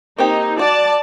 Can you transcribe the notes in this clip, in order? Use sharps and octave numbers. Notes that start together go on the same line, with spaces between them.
A#3 C4 D#4 G4
F#4 D5 A5